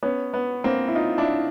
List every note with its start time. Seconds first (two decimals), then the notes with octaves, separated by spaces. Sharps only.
0.03 B3 C#4
0.34 B3
0.64 A#3 C4
0.88 E4
0.95 D#4 F4
1.18 D4 E4